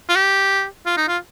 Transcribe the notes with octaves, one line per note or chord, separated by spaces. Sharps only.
F4
G4
F4
D#4
F4